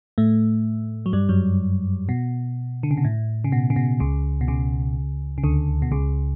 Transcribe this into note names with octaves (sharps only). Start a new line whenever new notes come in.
A2 A3
F#3
G2 G3
F#2 F#3
B2
D3
C#3
B2
A2
C#3
B2
C#3
B2
C#2 C#3
B2
C#2 C#3
C#3
D2 D3
B2
C#2 C#3